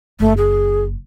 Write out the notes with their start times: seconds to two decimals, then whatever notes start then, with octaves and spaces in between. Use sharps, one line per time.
0.20 F#1 A3
0.37 G#4